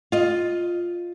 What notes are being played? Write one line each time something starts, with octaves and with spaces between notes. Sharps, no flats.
F4 D#5